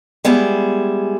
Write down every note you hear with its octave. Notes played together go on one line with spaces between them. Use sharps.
G3 G#3 B3 E4 G#4